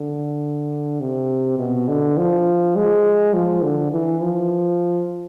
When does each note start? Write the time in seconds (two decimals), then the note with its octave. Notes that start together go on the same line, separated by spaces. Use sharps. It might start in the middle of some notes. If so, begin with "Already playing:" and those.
Already playing: D3
1.00 C3
1.58 B2
1.88 D3
2.18 F3
2.76 G#3
3.34 F3
3.63 D3
3.91 E3
4.21 F3